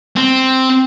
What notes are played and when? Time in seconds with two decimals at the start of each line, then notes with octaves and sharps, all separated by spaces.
0.16 C4